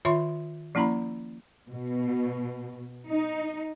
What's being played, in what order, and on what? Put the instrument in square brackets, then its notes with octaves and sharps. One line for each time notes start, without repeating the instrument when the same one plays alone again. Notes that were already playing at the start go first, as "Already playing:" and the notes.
[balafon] D#3 F4 C#5 E5 C6 C#6
F3 A#3 C#4 E4 A#5 B5
[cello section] B2
D#4